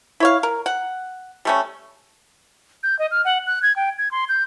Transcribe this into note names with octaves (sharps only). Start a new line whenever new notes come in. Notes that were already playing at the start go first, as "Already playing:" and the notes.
E4 C#5 F5
A#4
F#5
G3 A3 C#4
G6
D#5
F6
F#5
F#6
G#6
G5
G#6
C6
G6